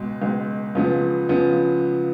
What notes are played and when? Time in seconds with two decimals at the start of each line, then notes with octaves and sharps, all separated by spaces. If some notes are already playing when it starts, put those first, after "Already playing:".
Already playing: C#2 B2 G#3
0.22 C#2 B2 G#3
0.75 C#2 C#3 F3 B3
1.29 C#3 F3 B3